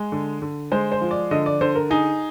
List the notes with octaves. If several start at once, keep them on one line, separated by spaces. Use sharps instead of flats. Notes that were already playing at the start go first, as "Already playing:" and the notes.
Already playing: G#3
D3
D3
G#3 C5
C5
F3
D5
D3 D#5
D5
D3 C5
A#4
D#4 G#4